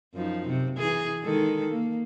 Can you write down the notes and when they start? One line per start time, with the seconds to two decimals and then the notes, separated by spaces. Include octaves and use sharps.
0.15 F#2 F3 D#4
0.48 C3
0.78 E3 G#4
1.23 D#3 G#3 A4
1.71 A#3